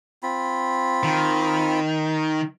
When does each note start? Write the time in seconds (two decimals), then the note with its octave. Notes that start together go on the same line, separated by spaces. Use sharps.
0.23 C4 F4 B5
1.03 D#3